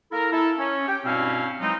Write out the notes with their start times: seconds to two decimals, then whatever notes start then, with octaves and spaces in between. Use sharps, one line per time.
0.12 A#3 E4 A4 A#4
0.32 E4 A4
0.58 C#4
0.88 G4 G5
1.05 G2 B2 C4 C#4 E4 F5
1.60 E3 F#3 G#3 C4 D#4